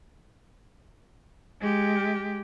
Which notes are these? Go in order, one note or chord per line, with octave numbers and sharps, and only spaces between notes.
G#3 G4